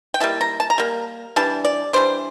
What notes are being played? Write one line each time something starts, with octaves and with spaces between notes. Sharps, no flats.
G5
G3 A#3 E4 A5
A#5
A5
A#5
G3 A#3
E3 G3 D4 A5
D5
E3 G3 D4 C5